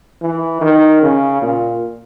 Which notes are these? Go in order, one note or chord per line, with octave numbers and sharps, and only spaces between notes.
E3
D#3
C#3
A#2